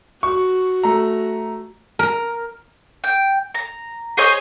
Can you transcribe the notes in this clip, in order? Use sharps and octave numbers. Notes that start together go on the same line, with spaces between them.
F#4 C#6
A3 A#5
A#4
G5
A#5
G#4 C5 C#5 D#5